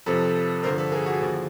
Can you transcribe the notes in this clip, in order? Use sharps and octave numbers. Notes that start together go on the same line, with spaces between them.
F2 C3 F3 A4 B4
G2 D3 F3 A#4 C5
A4 B4
G#4 A#4
F#4 G#4
D#2 D3 F3